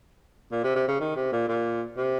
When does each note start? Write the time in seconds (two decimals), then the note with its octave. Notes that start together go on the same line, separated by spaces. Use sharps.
0.51 A#2
0.64 C3
0.76 C3
0.88 C#3
1.00 D#3
1.16 C3
1.32 A#2
1.48 A#2
1.97 C3